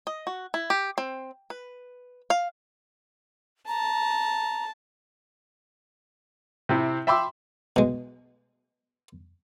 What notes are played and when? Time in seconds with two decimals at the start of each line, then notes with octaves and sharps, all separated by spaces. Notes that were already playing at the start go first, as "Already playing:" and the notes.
0.07 D#5
0.27 F#4
0.54 E4
0.70 G4
0.98 C4
1.50 B4
2.30 F5
3.68 A5 A#5
6.69 C3 C4 E4
7.07 E5 G5 B5 C6 D6 E6
7.76 B2 G#3